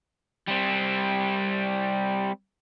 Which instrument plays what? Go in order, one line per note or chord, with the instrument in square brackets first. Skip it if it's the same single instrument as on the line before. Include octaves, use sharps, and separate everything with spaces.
[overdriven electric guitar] G3 C4